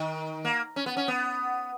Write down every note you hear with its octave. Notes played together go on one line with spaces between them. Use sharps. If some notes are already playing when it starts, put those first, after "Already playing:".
Already playing: D#3
A#3
C#4
B3
C#4
B3